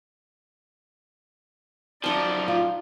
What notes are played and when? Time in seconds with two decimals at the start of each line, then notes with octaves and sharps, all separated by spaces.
2.04 F#2 F3 D#4 D5 A5
2.48 F4